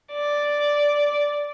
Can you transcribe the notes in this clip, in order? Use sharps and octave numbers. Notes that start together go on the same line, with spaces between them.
D5